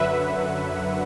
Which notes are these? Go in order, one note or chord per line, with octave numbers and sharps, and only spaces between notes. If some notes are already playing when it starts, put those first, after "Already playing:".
Already playing: F#2 D3 F#3 B4 E5 F#5